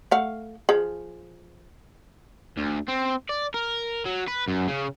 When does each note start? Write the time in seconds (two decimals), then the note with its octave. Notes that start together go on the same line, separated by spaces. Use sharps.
0.11 A3 F5 F#5
0.69 F3 G#4
2.58 D2
2.88 C4
3.29 D5
3.54 A#4
4.05 F#3
4.28 B4
4.48 F#2
4.68 C#3